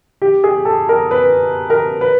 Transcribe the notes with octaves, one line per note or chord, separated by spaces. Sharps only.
G4
G#4
A4
A#4
B4
A#4
B4